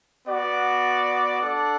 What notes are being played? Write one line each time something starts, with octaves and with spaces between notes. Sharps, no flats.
B3 F#4 D5 F#5
D4 A4 D5 F#5